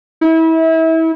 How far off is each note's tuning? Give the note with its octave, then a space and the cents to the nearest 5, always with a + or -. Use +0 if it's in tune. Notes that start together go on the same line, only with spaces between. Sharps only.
E4 -30